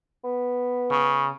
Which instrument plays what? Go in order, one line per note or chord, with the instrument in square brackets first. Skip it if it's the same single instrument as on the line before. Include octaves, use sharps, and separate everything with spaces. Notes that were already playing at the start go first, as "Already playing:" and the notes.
[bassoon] B3
[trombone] C#3